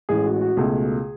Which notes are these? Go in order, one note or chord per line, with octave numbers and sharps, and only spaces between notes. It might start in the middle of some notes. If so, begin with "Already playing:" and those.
A1 A2 G#3 G#4
F#4
F#4
C#2 B2 A3 G#4